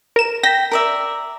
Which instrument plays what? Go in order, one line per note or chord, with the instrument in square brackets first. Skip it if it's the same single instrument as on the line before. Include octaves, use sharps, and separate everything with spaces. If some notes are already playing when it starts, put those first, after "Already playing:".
[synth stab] A#4 E7
[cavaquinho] G5 [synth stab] A#6 B6
[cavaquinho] A#4 D5 E5